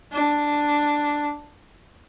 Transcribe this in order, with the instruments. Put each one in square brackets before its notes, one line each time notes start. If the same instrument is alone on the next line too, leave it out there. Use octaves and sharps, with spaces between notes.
[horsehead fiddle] D4